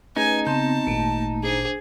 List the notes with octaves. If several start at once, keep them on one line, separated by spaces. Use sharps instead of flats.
A3 C#4 D#4 G#4 B4 G#5
C#3 B3 C4 A5 C6 G6
G#1 A#2 A3 A#3
D4 G#4 C5